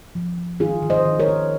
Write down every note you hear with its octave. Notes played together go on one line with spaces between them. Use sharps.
F3
F3
D#3 F4 G#4
D#3
C5 D#5
D#3
A#4 C#5
D#3